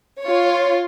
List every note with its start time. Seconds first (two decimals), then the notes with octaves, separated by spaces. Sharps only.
0.23 F4 C#5